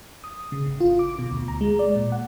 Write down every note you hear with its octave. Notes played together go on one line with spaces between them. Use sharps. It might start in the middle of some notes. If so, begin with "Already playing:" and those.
D#6
C#3
G#1
F4
D6
B2
D2
A#5
G#3
D5
A#2
F#5